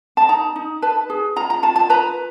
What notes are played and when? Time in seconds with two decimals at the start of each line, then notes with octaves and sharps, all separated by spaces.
0.17 A5
0.29 D#4 A#5
0.56 D#4
0.82 B4 A5
1.10 G#4
1.36 F4 A#5
1.50 A#5
1.63 F4 A5
1.76 A5
1.90 B4 A#5